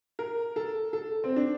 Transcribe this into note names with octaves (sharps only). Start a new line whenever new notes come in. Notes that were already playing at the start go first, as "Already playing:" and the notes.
A#4
A4
A4
C4
D4